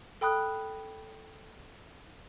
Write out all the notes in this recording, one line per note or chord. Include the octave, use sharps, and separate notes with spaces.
A4 G5 B5 D#6 F#6